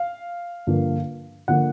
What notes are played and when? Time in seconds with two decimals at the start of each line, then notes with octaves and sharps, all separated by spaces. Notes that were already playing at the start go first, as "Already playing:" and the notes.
Already playing: F5
0.67 G2 D3 F3 A#3
1.48 D3 F3 A#3 F#5